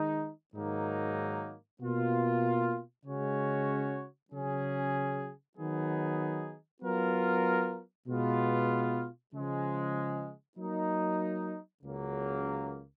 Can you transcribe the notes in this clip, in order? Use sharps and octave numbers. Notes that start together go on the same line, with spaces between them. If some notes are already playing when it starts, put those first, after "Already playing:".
Already playing: D#3 G#3 D#4
G#2 D#3 F#3 A#3 D#4
B2 A#3 F4
C#3 G#3 C#4 F#4 C#5
C#3 F#3 C#4 G#4
D#3 F#3 B3 D#4 G#4
F#3 B3 F4 A#4
B2 G#3 B3 F4
C#3 F3 G#3
F#3 A#3 D#4
C#2 C#3 F#3 A#3